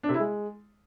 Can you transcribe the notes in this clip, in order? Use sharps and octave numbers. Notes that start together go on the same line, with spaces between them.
D4
C3
E4
G#3